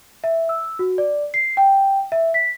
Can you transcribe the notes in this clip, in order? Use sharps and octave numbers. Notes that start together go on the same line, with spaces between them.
E5
E6
F#4
D5
C7
G5
E5
B6